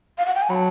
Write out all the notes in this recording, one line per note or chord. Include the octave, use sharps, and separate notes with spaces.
F5
F#5
G5
G#5
F#3 A5 B5